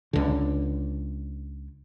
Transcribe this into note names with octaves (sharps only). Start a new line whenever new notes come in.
C#2 D3